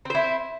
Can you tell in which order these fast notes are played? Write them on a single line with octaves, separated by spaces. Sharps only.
C4 C5 E4